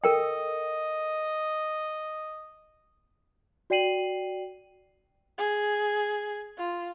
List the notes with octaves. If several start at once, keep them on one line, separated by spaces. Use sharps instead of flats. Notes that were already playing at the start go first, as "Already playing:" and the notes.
A4 A#4 D#5 G5
F#4 D5 G5 C7 D#7 F#7
G#4
F4